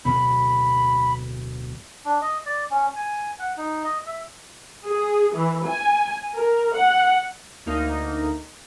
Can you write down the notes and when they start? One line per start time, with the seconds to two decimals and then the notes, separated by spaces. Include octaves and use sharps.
0.05 D1 B2 B3 B5
2.05 D4
2.22 D#5
2.46 D5
2.71 C#4
2.95 G#5
3.39 F#5
3.57 D#4
3.84 D#5
4.06 E5
4.85 G#4
5.35 E3
5.65 G#5
6.36 A#4
6.74 F#5
7.66 D2 A#3 D#4